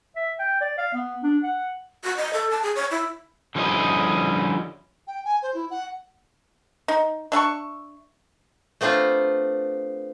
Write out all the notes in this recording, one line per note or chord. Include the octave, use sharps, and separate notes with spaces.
E5
G5
D5
F5
B3
D4
F#5
F#4
D#5
A4
A5
G#4
C#5
E4
D3 F3 G3 C#4 E4 D#5
G5
G#5
C5
E4
F#5
D#4
D4 E5 A5 C#6
A3 B3 C4 D4 F4